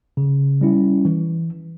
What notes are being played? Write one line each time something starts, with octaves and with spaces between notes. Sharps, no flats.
C#3
G3 C#4 E4
E3